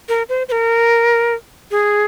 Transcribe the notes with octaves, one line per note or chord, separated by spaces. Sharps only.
A#4
C5
C5
A#4
G#4